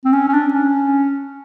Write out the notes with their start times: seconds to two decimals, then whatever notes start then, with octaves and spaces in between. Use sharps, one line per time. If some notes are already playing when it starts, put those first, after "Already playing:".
0.05 C4
0.13 C#4
0.28 C#4
0.34 D4
0.54 C#4